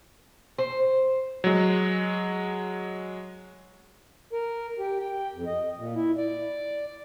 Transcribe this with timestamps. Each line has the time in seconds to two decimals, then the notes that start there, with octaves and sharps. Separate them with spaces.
0.59 C5
1.44 F#3 G#3
4.33 A#4
4.79 G4
5.00 G5
5.35 F2
5.47 D#5
5.77 A#2
5.95 E4
6.17 D5